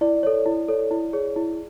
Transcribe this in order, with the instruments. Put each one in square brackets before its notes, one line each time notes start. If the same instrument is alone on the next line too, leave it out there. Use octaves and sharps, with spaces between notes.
[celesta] E4 D5
A4 C#5
E4
A4 C#5
E4
G#4 C#5
E4